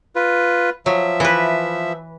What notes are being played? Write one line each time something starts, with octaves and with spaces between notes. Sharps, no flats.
F4 B4
F3 F#3 E5
E3 B4